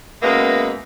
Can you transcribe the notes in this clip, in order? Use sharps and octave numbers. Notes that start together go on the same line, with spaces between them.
F#2 G#3 A#3 B3 B4 E5